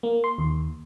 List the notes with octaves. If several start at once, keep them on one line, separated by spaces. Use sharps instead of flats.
A#3
C6
D#2